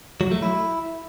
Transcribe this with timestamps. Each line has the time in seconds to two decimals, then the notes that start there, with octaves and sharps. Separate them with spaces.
0.21 F#3
0.32 A3
0.42 E4